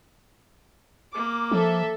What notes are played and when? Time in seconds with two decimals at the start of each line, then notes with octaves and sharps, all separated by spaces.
1.12 A#3 D6
1.51 F3 A4 E5